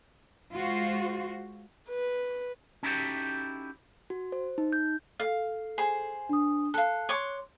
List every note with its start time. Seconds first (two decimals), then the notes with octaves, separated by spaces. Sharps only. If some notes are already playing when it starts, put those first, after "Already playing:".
0.53 G#3 F4 F#4 C5
1.89 B4
2.83 C#4 D#4 E4 F#4 G4 A4
4.10 F#4
4.32 C5
4.58 D#4
4.72 G6
5.20 A4 F5
5.78 G#4 C5
6.29 D4 D#6
6.74 A4 F5 F#6
7.09 C#5 C6 D6